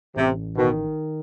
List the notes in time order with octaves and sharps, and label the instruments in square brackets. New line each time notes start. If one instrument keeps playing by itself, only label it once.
[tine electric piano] A1 [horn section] C3
[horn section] B2 [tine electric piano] D#3